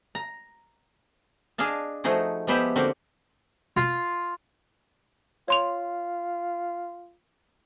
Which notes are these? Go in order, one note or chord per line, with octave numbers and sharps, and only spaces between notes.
A#5
D4 G#4 D#5 F5 A5
F3 A3 D#4 F#4 G#4
F3 G#3 B3 G4 C5 E5
D3 A#3 C4 F#4 G4
F4
F4 C#5 C6 F7